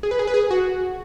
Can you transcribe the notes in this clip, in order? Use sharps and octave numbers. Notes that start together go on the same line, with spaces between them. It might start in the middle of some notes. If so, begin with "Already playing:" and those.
G#4
B4
G#4
B4
G#4
F#4